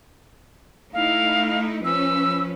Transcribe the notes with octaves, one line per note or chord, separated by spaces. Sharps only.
A3 D#4 E4 F5
F3 C#4 B4 E6